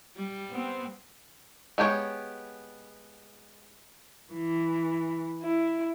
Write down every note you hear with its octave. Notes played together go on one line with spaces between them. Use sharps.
G3
B3 C4
G#3 B3 G4 C#5
E3
E4